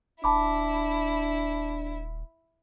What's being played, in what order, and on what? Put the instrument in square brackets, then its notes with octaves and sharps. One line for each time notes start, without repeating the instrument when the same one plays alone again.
[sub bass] D#1 [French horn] D4 [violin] E4 [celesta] A5 B5 D6